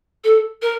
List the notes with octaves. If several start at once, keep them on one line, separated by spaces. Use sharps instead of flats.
A4
A#4